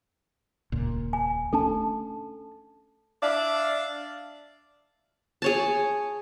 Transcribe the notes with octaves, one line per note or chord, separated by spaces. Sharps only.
D#1 C#2 A#2
G#5
A3 C#4 D4 A4 A5
D4 D5 E5 F5
G#4 C#5 A5